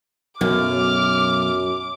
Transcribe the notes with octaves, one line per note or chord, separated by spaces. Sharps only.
B1 F#2 D6 F6